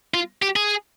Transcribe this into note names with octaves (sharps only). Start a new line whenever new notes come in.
F4
G4
G#4